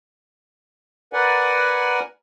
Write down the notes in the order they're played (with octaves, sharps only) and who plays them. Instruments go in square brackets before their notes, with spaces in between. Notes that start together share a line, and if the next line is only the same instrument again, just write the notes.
[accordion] A#4 B4 D5 F#5 G#5